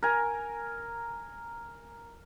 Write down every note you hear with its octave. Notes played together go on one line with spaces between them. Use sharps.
A#4 G#5